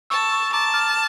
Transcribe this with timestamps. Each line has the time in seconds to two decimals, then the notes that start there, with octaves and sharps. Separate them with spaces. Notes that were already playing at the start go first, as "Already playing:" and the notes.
0.10 A5 C#6 E6
0.31 C#6 E6
0.53 A5 A#5 D6
0.74 D6 F6